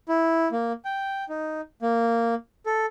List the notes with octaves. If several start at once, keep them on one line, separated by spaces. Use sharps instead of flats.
E4
A#3
G5
D#4
A#3
A4